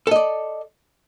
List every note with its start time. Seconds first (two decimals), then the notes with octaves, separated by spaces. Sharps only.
0.07 A4
0.11 D#5
0.16 D5